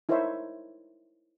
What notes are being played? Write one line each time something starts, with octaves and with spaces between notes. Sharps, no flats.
D#4 E4 A#4 C5 C#5 E5